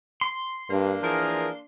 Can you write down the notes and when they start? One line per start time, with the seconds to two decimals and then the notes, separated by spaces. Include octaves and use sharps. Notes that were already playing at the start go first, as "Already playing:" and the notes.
0.21 C6
0.70 G2 A#3 D4
1.03 E3 F3 G#4 A#4